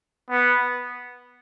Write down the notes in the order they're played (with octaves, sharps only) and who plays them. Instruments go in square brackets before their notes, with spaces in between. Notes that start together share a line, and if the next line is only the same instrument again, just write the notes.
[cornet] B3